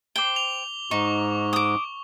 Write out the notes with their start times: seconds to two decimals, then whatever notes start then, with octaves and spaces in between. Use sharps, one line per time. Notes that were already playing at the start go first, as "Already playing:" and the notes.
0.16 C5 G5 D6 G7
0.36 F7
0.91 G#2 D#4 C#6
1.53 D6 D#6